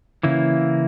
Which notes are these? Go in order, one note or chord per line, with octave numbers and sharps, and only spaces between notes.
C#3 E3 A#3 E4